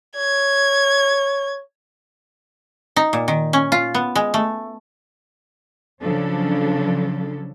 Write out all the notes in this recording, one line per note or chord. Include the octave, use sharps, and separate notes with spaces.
C#5 G#6
D#4
A#2
D#3
C#4
F4
B3
G#3
A3
C#3 F3 F#3 C#4 D4 A4